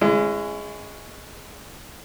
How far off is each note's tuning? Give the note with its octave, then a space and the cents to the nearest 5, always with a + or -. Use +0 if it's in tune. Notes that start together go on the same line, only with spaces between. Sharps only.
G#3 +0 C#4 +0 E4 +40